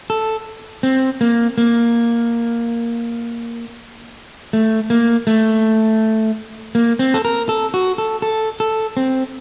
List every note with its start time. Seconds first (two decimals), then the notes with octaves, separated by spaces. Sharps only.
0.10 A4
0.83 C4
1.21 A#3
1.58 A#3
4.53 A3
4.90 A#3
5.27 A3
6.75 A#3
6.99 C4
7.14 A4
7.25 A#4
7.49 A4
7.74 F#4
7.98 A4
8.22 A4
8.60 A4
8.97 C4